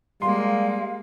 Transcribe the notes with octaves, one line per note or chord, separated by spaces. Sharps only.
G3 G#3 A#3 F5 C6